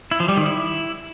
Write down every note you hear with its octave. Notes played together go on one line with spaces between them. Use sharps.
E4
F3
G3
D#3
E4